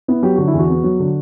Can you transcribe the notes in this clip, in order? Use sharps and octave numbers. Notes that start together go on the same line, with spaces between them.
B3 E4
F#3 G4
D3 F#4
E4
E2 F#4
B3
F#3
D3